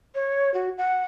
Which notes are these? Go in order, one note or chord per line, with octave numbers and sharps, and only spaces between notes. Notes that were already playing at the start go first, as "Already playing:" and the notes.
C#5
F#4
F#5